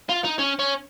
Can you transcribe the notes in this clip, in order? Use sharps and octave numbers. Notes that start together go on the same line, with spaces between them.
F4
D#4
C#4
C#4